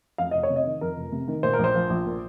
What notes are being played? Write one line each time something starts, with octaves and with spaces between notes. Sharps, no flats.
F2 F5
F1 D#5
C#5
C3
D#5
D#3
F2 A#4
F1
C3
D#3
A#2 C5
A#4
A#1
C5
F3
A#1
A#2